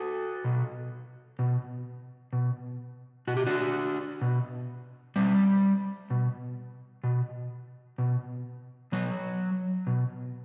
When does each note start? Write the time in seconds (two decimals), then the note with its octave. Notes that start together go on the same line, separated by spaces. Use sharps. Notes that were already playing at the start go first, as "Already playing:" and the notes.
Already playing: F#4 A4
0.44 B2
1.39 B2
2.33 B2
3.27 B2 F#4
3.37 G4
3.47 D4 F#4
4.21 B2
5.16 B2 G3
6.10 B2
7.04 B2
7.98 B2
8.92 B2 F#3
9.87 B2